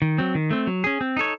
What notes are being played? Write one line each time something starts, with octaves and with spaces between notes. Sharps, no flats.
D#3
F#3 C4
D#3
A3 C4
F#3
C#4 G#4
C4
D#4 A4 C#5